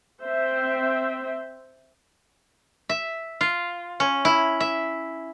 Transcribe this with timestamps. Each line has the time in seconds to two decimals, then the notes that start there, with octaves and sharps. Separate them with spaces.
0.21 C4 C5 E5
2.89 E5
3.41 F4
4.00 C#4
4.25 E4
4.60 E5